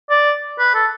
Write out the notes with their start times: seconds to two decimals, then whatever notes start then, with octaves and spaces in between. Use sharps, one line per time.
0.10 D5
0.59 B4
0.74 A4